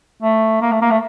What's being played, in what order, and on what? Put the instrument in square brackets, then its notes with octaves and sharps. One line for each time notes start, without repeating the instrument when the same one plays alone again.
[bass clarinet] A3
A#3
A3
A#3
A3